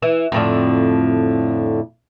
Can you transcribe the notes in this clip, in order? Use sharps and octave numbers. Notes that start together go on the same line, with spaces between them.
E3
F2 A2 D3